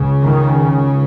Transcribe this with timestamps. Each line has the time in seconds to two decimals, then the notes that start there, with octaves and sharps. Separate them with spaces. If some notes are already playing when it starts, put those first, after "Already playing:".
Already playing: C#2 C#3
0.23 D#3